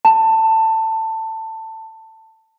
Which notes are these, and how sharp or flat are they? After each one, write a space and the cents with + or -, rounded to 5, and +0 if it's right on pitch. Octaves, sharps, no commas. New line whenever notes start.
A5 +20